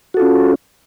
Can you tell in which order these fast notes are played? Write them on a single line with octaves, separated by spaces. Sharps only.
F#4 A4 F4 C#4